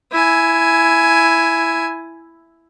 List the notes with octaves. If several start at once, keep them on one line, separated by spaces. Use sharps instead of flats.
E4 G#5